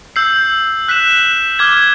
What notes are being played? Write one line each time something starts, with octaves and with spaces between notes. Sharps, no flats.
E6 G6 C7
F#6 B6 E7
D6 F6 G#6